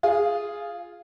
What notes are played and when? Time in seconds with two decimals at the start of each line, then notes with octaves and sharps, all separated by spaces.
0.03 F4 G#4